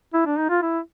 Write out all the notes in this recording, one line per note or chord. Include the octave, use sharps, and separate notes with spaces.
E4
D4
D#4
F4
E4